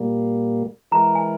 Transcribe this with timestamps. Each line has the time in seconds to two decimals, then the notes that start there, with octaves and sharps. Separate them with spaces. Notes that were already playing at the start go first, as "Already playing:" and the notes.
Already playing: A#2 G3 A#3
0.91 E3 G#3 E4 A#4 A#5
1.15 G#5